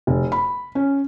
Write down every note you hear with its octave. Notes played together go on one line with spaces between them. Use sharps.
F1
B5
C#4